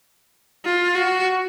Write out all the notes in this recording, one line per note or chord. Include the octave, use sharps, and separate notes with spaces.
F4
F#4